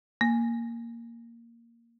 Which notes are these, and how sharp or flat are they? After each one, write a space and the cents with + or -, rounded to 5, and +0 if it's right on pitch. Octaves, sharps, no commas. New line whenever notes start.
A#3 -5